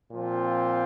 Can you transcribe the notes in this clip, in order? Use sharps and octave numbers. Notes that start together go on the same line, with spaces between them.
A#2 F3 C4 F4